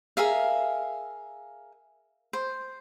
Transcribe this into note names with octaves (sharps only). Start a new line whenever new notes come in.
G#4 A#4 E5 F5
C5